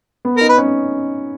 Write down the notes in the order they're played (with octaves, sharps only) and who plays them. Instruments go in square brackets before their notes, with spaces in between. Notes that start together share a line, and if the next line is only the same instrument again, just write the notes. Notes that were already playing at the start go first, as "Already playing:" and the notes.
[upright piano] B3
[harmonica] A#4
[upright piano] D#4
[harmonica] B4
[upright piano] C#4